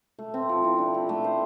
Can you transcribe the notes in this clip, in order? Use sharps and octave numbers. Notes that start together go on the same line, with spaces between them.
A3
C4
F3
E4
D4
G4
A3
C5